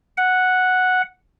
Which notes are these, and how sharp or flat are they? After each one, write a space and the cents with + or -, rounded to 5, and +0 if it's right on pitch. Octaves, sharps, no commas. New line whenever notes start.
F#5 -5